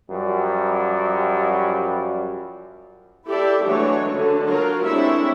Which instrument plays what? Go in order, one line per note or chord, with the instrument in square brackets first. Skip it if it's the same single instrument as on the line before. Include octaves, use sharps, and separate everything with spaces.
[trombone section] F#2 F3 G3
[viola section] E4 G4 A4 D5 E5
E3 F#3 G#3 A3 D4 C#5
D3
F#3 F4 F#4 A#4
G#3 C4 D4 E4 C#5 E5